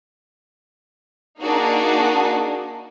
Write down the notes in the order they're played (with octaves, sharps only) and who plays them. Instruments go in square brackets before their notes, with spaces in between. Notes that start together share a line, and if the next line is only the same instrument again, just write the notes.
[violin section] A#3 D4 D#4 F#4 G#4